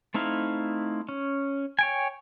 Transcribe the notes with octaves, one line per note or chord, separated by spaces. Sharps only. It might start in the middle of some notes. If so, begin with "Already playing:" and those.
A3 C4 D#4 E4 F5
C#4
C#5 G5 G#5